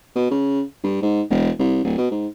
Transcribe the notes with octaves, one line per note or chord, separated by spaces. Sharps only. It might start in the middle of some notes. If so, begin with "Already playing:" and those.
B2
C#3
G2
G#2
E1
C2
D1
B2
G#2